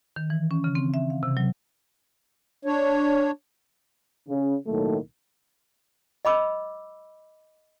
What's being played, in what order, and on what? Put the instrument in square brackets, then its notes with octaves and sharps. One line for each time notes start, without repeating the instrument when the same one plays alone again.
[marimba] D#3
E3
C#4
C#3
C4
E5
F5
C3
F#3
[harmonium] D4 C#5
[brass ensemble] C#3
B1 A2 D#3 F#3 A3 A#3
[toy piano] D#5 B5 D6 E6